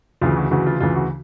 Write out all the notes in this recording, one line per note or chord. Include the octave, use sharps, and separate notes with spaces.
D2 C#3 E3 F4
F#4
D2 C#3 E3 F#4
F4
D2 C#3 E3 F4
F#4